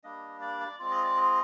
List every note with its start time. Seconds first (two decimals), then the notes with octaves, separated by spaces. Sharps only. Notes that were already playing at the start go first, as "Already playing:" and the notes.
0.03 G3 A#3 D4 D#5
0.41 D5
0.60 D5
0.79 G#3 C4 F4 D5
0.91 D#5
1.04 D5
1.17 D#5